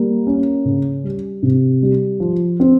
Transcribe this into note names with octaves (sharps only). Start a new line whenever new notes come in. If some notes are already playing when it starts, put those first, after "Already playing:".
Already playing: G3 A#3
C#4
C#3
G3
C3
G3
F3
C4